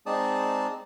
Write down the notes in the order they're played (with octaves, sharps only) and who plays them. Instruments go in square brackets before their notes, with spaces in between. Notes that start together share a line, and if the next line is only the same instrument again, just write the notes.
[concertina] G#3 C4 D#4 D5 A5 D#6